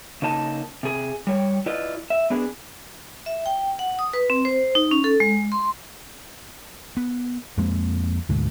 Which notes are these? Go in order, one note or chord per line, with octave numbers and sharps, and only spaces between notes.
C#3 A#3 D#4 A5
C3 G#4
G3 C#5 G5
E4 F4 B4 D5 D#5
E5
B3 D4 G#4 B4
E5
G5
F#5
D#6
B4
C4
C5
D#4
C#4
A4
G#3
C6
B3
F2 G#3 A#3 C4
D2 G#2 B2 D3